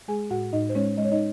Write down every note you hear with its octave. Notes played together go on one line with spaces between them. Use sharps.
G#3 G#4 G#5
A2 F#4 F#5
A2 D#4 D#5
C5
G#3 C#4 C#5
G#3 D#5
C#5
D#4 D#5